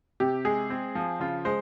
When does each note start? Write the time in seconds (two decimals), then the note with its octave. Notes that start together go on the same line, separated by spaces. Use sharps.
0.20 C3 G4
0.45 G#3 G#4
0.70 C4
0.95 F3
1.20 C#3 F4
1.45 G#3 C5